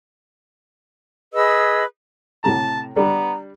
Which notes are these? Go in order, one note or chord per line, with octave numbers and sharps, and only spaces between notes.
G#4 B4 D#5 E6
A2 C3 A5 A#5
G3 B3 D4 A#5